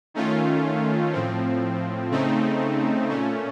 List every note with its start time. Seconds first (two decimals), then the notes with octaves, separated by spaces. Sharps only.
0.14 D#3 A3 C#4 F4
1.12 A2 F3 C4
2.11 C#3 A3 C4 D#4
3.09 A#2 A3 C#4